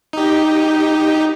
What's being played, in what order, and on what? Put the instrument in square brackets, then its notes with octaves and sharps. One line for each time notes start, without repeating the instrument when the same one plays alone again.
[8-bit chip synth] D#4 G4